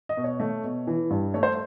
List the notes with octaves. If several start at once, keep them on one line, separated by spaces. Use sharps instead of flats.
D#5
B2
C#5
A3
B2
E3
G2
A3 C#5
C5